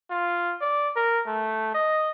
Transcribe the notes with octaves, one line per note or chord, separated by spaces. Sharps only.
F4
D5
A#4
A3
D#5